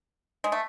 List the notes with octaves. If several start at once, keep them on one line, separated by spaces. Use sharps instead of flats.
G#3
A3